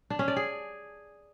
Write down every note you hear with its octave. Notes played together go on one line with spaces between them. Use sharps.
D4
C#4
D5
G#4